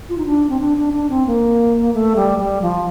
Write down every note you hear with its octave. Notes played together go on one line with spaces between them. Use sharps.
F4
D#4
D4
C4
D4
D4
D4
C4
A#3
A3
G3
G3
F3